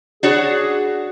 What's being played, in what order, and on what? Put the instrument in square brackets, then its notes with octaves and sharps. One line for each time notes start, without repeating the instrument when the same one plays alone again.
[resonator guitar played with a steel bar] D4 F#4 C#5 [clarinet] G#4